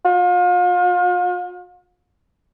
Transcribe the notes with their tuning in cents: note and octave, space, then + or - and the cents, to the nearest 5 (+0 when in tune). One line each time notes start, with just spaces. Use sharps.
F4 +40